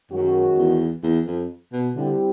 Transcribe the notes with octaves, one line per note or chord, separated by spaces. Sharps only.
F#2 D#3 G#3 C#4 F#4
E2
E2
F2
B2
D3 G3 C4 E4 G4